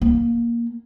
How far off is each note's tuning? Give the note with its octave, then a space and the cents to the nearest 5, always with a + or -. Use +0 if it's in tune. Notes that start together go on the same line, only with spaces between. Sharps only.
A#3 +10